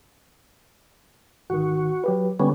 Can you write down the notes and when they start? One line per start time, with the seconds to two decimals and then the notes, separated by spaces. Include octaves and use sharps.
1.50 G#1 D#3 F#4
2.04 F#3 G4 B4
2.39 D3 G3 B3 C#4